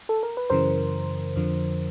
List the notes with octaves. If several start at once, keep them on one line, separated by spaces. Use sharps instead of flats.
A4
A#4
B4
F#2 C#3 E3 A#4 C5
F2 D3 F3